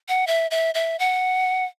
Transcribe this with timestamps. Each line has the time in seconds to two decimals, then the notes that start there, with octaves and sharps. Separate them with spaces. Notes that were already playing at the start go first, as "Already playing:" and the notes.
0.09 F#5
0.27 E5
0.51 E5
0.75 E5
0.99 F#5